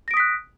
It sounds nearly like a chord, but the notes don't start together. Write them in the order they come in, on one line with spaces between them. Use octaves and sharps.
A#6 D7 D#6 B6 F#6